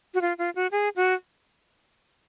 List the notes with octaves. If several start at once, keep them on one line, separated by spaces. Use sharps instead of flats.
F#4
F4
F4
F#4
G#4
F#4